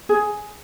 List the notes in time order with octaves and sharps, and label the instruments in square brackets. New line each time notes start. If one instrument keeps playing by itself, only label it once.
[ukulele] G#4